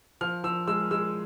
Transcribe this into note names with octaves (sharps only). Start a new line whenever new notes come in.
F3 F6
F3 E6
G#3 E6
G#3 E6